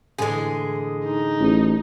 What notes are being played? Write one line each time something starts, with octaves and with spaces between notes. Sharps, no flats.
A2 D3 E3 G#3 G#4
D#4
A1